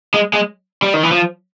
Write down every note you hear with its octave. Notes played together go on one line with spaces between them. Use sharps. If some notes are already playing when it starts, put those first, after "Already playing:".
G#3
G#3
G3
D#3
E3
F3